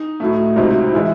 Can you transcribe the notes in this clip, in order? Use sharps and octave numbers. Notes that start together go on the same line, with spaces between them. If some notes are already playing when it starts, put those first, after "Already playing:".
Already playing: D#4
A2 F#3 A3
C#2 C3 F#3 D#4
E3 G#3 E4